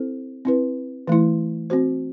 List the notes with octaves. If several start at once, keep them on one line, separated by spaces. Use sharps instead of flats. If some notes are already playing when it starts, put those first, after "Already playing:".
Already playing: C4 E4 A4 C5
C4 E4 B4
E3 A3 E4
C4 F#4 C5